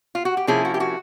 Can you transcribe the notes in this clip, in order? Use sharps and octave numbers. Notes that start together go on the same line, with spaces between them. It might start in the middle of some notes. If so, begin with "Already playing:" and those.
F4
F#4
G4
C3 F3 A#3 C#4 E4 G#4
F#4
G4
F#4